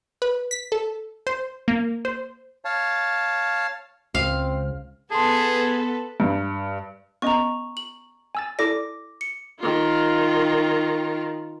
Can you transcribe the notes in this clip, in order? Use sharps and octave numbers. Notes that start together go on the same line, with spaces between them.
B4
B6
A4
C5
A#3
C5
C#5 F5 A5
C#2 C4 F5
B3 G#4 A4 B4 A5 C6
G2
B3 C#4 D#5 A#5 C#6
F#7
G#5 E6 A6
E4 A4 D5 D6 A#6
C#7
D#3 F4